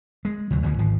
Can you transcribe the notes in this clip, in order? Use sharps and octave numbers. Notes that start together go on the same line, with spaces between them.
G#3
D2 C3 F#3
D2 D3 D#3 F3
G#1 F3